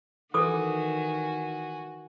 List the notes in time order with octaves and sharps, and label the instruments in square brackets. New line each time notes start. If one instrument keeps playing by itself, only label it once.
[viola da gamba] D#3 [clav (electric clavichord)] E3 [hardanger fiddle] F#4 G#5 [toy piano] A4 D6 D#6